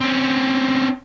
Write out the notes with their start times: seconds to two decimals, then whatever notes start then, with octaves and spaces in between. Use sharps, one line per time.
0.01 C4 C#4